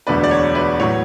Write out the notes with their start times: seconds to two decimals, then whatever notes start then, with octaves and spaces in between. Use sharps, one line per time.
0.07 E1 D2 D3 B4 D5
0.24 D5
0.31 C#5
0.55 B4 D5
0.80 A2 F#3 B3 C#5